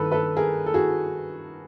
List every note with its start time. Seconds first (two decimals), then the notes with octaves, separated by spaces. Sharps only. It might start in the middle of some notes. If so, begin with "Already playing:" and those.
Already playing: G2 D#3 A4 B4
0.12 A4 B4
0.37 G#4 A#4
0.66 A4
0.74 F#4 G#4